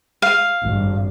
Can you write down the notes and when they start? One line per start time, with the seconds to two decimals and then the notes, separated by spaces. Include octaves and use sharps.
0.22 F5
0.63 G#1 G2